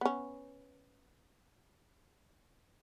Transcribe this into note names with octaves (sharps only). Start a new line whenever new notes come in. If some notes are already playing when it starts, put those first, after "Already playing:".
B3 C#4